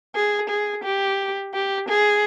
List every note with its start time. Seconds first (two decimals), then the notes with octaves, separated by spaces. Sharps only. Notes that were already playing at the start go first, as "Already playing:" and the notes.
0.15 G#4
0.50 G#4
0.84 G4
1.54 G4
1.89 G#4